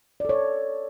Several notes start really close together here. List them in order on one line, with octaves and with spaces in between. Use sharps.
D5 A4 C#5